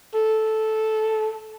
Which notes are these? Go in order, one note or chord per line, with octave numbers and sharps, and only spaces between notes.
A4